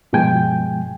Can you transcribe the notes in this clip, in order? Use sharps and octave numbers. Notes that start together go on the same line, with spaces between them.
G2 B2 F3 G#3 G5 G#5